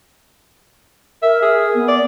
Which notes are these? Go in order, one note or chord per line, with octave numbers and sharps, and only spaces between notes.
A#4 E5
G#4
B3
D5